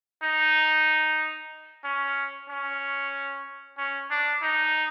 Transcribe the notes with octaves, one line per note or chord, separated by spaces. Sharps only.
D#4
C#4
C#4
C#4
D4
D#4